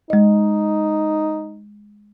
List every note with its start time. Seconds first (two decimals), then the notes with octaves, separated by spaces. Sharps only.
0.10 G#3 D#4 D#5